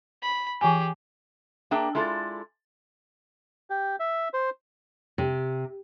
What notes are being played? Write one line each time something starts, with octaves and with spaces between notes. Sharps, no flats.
B5
E3 G4 G#4 G#5
A#3 D4 G#4 E5 G5 A5
G#3 E4 F4 A4 A#4 D5
G4
E5
C5
C3